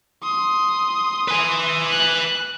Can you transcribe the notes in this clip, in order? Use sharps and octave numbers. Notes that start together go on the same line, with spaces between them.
C6 D#6
B4 G#5
F#6